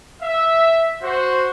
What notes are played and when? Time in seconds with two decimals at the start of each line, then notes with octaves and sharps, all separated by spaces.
0.22 E5
1.02 F#4 C5